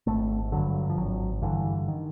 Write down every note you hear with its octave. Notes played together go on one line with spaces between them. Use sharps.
G#1 A3
G2 D3 F#3
F3
G#1 F#3
G2 D3 E3
D#3